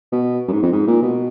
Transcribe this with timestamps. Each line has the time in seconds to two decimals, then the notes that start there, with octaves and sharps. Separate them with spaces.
0.12 B2
0.48 F#2
0.52 G#2
0.62 F2
0.72 G#2
0.87 A#2
1.02 B2